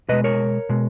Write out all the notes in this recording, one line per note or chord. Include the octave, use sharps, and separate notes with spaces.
B2 G#3 B4 D#5
A#4 C#5
B2 G#3